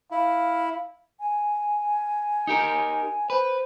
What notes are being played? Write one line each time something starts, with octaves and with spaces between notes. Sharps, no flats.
E4 F5
G#5
D#4 G4 A#4
B4 C5